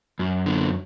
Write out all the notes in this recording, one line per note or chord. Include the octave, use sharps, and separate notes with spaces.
F#2
D3